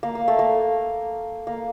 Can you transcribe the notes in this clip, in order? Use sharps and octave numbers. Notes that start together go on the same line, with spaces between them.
A#3
A#3
A3
A#3
A#3